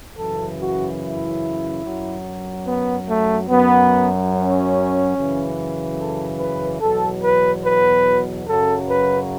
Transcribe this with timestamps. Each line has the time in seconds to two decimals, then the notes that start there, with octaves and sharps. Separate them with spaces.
0.18 F#2 C#3 E3 A4
0.59 F#4
1.01 E4
1.84 F#2 F#3
2.67 B3
3.09 A3
3.50 F#2 F#3 B3
4.33 C#4
5.16 F#2 C#3 E3
5.98 A4
6.39 B4
6.81 E2 B2 F#3 A4
7.23 B4
7.64 B4
8.47 F#2 C#3 F#3 A4
8.88 B4